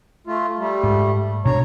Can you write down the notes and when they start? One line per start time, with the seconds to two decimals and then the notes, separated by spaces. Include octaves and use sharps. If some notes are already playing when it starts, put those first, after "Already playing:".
0.27 A3 F4
0.59 G3 A3
0.83 G#2
1.45 B2 D4 C#5 A#5